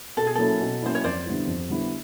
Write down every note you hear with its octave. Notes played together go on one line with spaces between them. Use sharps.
B2 A4
G#4
F#3 A#3 C#4 E4 A4
B2
F#3 A#3 C#4 E4 C5
C#5
F2 C5 D5
D3 G3 B3 E4
F2
D3 G3 B3 E4